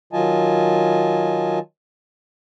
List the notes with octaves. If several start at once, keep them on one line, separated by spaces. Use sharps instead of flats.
D#3 F#3 F4 D#5 G#5 A5